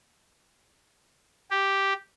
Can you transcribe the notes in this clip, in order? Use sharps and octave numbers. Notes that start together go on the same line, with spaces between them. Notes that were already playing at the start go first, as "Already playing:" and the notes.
G4